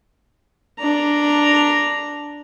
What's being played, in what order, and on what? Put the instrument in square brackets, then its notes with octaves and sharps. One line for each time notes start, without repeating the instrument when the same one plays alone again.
[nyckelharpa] D4 A#5